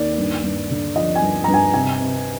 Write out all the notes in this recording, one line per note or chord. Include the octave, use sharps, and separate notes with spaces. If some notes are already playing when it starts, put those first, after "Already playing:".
Already playing: D#2 D5
G2
G2
D3
F3 D#5
G#5
G2
G2 A#5
G#5
C3 G#5
C3